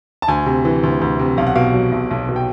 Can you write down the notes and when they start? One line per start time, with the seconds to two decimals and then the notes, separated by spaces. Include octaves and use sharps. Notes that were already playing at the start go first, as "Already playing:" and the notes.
0.22 A5
0.28 D2 G#5
0.46 C3
0.65 E3
0.83 D2
1.01 D2
1.19 C3
1.37 B1 F5
1.47 F#5
1.55 B2 F5
1.74 F#3
1.92 B1
2.11 B1
2.29 B2
2.36 G5